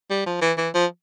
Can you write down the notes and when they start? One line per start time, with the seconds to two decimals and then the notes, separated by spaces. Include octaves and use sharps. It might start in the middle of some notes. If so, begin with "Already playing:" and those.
0.10 G3
0.26 F3
0.41 E3
0.57 E3
0.74 F3